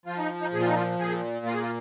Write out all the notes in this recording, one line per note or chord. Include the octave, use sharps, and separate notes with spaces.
F3 F4
D#4
D#4
A#2 G#4
F4
D#4
F4
A#2 G#4
A#3 F4
G#4
F4